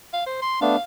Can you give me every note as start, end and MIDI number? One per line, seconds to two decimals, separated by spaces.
0.13 0.24 77
0.26 0.37 72
0.42 0.61 84
0.61 0.76 57
0.61 0.76 59
0.61 0.76 62
0.61 0.83 77